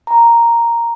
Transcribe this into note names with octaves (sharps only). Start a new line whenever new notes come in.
A#5